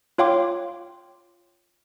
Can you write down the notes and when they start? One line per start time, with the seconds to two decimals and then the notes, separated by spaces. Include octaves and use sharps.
0.18 F4 C#5 F5 G5 C6 D6